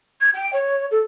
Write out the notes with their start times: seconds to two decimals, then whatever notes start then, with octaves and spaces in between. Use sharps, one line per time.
0.21 G#6
0.34 G5
0.53 C#5
0.91 A4